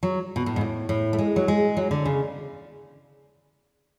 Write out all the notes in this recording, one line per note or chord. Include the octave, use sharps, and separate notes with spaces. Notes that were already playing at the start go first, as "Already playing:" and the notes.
F#3
B2
A2
G#2
A2
A2
A3
G#3
F#3
G#3
F#3
D3
C#3